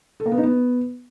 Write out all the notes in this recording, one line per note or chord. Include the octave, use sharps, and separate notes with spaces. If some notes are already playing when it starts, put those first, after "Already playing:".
A4
A#3
B3
D#4
B3